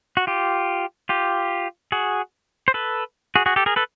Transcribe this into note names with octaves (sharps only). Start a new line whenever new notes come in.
F#4
F4 G4
F4 G4
F#4 G#4
C5
A4 B4
F#4 G#4
F#4 G#4
G4 A4
G#4 A#4
A4 B4